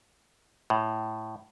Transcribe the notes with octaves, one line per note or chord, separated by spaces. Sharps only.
A2